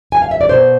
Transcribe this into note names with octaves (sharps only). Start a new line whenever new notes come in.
G#5
F5
E5
D5
B2 C5